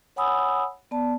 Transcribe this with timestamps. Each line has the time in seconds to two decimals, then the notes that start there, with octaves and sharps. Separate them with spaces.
0.16 C#5 F#5 G#5 B5 D#6 E6
0.91 B3 D5 A5